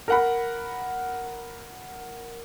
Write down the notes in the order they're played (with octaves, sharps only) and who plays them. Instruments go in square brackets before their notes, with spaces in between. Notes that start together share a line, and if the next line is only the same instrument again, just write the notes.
[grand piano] A#4 F#5 B5